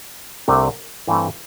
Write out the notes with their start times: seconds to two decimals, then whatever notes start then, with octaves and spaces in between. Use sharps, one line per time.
0.48 C2 C3 A3 D4
1.07 G2 E3 A3 C4